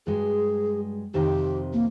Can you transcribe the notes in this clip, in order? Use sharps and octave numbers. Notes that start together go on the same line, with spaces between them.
G2 F#3 G#3 G#4
F2 C3 D#3 G4
A#3